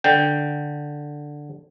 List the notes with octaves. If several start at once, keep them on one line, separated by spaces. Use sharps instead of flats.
D3 G5